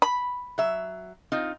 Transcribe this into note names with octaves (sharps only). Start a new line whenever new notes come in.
B5
F#3 E5
C4 D#4 F4